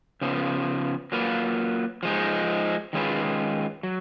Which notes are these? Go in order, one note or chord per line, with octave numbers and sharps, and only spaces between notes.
C#3 F3 B3
F#3 A#3 F4 B4
F3 G#3 D#4
D#3 G#3 C#4 F4 B4
F#3